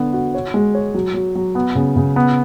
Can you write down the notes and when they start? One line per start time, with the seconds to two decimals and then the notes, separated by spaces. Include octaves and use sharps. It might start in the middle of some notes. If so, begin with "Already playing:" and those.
Already playing: D3 B3
0.13 F#4
0.35 C#5
0.54 G#3
0.75 C#5
0.94 F#3
1.14 F#3
1.35 F#3
1.55 B3
1.75 C#3
1.96 C#3
2.16 B3